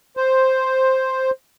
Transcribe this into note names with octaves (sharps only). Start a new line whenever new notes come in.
C5